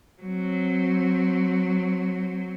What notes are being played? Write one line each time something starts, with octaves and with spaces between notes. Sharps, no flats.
F#3 C4